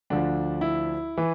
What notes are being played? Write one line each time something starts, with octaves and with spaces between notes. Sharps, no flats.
D2 D3 F3 D4
E4
E3